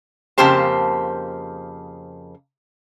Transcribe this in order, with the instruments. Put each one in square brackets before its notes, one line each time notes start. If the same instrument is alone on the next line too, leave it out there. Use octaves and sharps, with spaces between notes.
[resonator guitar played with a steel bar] F2 C#3 A#3 G4 C5 A5